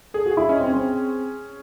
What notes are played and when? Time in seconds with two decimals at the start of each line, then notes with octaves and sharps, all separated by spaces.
0.14 G#4 A4
0.26 F#4
0.31 G#4
0.37 E4
0.49 C#4 D#4
0.60 C4
0.66 C#4
0.73 C4